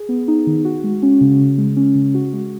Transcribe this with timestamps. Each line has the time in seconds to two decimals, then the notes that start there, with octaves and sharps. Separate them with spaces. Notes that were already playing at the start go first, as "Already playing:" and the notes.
Already playing: G#4
0.09 B3
0.28 D#4
0.47 D#3
0.65 F#4
0.84 G#3
1.02 C#4
1.21 C#3
1.40 C#3
1.58 G#3
1.77 C#4
1.95 C#3
2.14 F#4
2.33 G#3